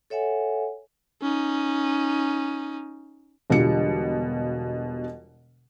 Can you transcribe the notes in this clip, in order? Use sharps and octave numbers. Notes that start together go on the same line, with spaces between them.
A4 C#5 E5 F#5 G#5
C#4 D#4
E1 B2 D3 G3 F4 C#7